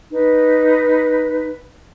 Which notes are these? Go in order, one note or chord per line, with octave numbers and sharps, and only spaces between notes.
D#4 B4